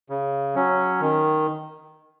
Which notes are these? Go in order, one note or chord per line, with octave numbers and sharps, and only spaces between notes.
C#3
F#3 C#4
D#3